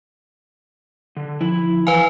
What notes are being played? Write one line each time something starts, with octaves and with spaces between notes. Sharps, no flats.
D3
F3 E4
E3 B4 C5 E5 F5 G#5